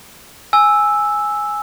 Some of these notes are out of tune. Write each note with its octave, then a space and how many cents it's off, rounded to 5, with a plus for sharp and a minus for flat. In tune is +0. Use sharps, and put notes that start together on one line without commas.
G#5 +0 E6 -5